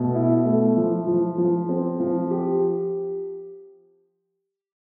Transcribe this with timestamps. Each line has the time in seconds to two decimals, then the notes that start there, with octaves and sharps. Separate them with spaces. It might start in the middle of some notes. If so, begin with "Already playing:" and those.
Already playing: B2 A3
0.14 E4
0.45 A3
0.77 F3
1.07 F3
1.38 F3
1.69 C4
2.00 F3
2.31 G4